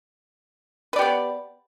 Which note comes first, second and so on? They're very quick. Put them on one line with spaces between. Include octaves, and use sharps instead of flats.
B4 D5 G4 B3